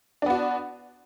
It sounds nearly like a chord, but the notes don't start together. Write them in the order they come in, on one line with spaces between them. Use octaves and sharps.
D4 B3 F#4